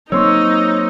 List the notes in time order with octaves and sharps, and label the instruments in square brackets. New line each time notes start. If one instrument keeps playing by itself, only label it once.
[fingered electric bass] F#3 A#3 C4 [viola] D#4 [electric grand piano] C#5 C6 C#6 [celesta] E6